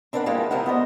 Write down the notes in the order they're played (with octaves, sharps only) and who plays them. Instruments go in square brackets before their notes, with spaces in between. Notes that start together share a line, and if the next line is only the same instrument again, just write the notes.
[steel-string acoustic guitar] C4 D4 A#4 B4 F5 F#5
F3 G3 G#3 A#3 E4 F4
C3 F3 D4 E4 A#4 F#5
D2 B3 C5 D#5